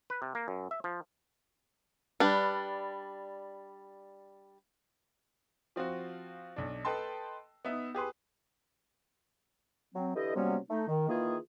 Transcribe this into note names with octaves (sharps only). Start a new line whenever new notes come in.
B4
C3
A#3
F#2
E5
F3
G3 D4 B4
F3 C4 F4 F#4
B1 D4
A4 B4 D#5 G5 A5 C6
B3 D#4 E5
G4 G#4 B4 C6
F#3 C4
D3 E3 G4 A4 D#5
C3 F#3 G3 A#3 B3 C#4
A3 D#4
D#3
D#3 E3 A#3 F4 G#4